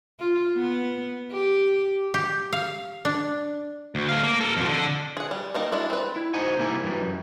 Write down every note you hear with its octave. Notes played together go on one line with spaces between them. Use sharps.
F4
B3
G4
G4
F5
D4
D2
A3 F5
A#3
A4 A#4
F2 B2
D3
G#4 F#5
G3
G3 A#3 D#4
G#3 D4 E4 F#4
C4 B4
E4
D#4 F#4 C5 D#5 F#5 G#5
C2 G3 A#3 E4 G#5
G2 E3 F#3 G3
F#2